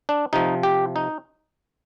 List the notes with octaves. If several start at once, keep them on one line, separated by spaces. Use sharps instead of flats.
D4
C3 F3 D#4
G4
D#4